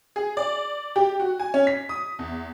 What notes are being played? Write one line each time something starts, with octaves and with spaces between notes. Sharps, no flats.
G#4
D5
G4
F#4
G#5
C#4
B6
D#6
E2